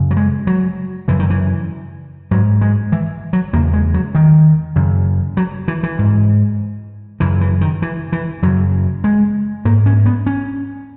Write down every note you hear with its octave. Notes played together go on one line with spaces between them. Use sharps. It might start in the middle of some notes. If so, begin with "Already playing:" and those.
Already playing: F#2 C#3
F#3
G#3
F#3
F#2 C#3 E3
D#3
E3
G#2 F#3
G#3
E3
F#3
E2 C#3 A#3
G#3
F#3
D#3
F#2 C#3
F#3
E3
E3
G#2
F#2 C#3 E3
E3
D#3
E3
E3
F#2 C#3 F#3
G#3
G#2 A#3
C#4
B3
C#4